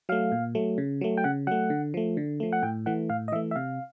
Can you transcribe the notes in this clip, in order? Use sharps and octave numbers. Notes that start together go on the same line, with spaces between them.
F#3 A3 F5
A#2
F#3 A3
C#3
F#3 A3
G5
C#3 F#5
F#3 A3 F#5
D3
F3 A3
D3
F3 A3
F#5
A2 G5
E3 A3 F#5
A2 F5
D#5
E3 A3 E5
E5
C3 F5